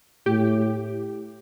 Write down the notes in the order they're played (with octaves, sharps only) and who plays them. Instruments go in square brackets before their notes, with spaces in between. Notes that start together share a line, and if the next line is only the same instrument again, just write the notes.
[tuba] A2 [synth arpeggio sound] G4